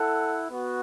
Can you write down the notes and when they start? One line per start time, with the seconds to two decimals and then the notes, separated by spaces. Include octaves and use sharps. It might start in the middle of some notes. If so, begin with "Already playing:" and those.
Already playing: E4 A4 F#5
0.50 B3 F#4